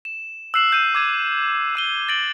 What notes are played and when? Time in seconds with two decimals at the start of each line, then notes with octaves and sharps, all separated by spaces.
0.05 E7
0.54 E6 F#6 C7 E7 F#7
0.71 F#6 G6 D#7
0.95 D6 G#6 D#7
1.75 E6 D#7 G7
2.09 A6 A#6 D7 F#7